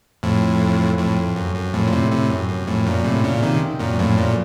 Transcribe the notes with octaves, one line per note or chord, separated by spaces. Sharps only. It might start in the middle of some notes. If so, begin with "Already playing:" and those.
F2 A2
F2 A2
F2
F#2
F#2
F2 A2
A#2
A2 C3
A2 C3
F#2
F#2
F2 A2
F#2 A#2
A2 C3
A#2 C#3
C3 D#3
F#2 A#2
F2 A2
F#2 A#2